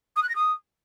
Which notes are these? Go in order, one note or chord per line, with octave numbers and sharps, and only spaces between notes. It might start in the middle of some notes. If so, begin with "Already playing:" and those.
D#6
F#6
A#6
D#6